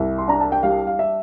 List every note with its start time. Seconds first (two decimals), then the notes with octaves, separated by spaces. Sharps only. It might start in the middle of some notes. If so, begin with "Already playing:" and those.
Already playing: C2 E5
0.18 C6
0.28 D4 A#5
0.41 A5
0.52 G5
0.63 G3 F5
0.87 F5
0.99 E5